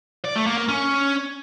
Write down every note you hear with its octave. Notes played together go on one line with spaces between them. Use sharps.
D5
A3
A#3
A#3
C#4